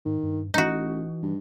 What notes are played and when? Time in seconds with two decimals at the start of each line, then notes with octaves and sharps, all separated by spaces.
0.06 G#2 D#3
0.23 G2
0.54 A1 E3 D#4 F#4
1.23 G2